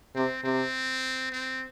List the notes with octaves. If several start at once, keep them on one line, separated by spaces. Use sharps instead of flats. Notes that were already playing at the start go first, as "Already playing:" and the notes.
C3 C4
C3 C4
C4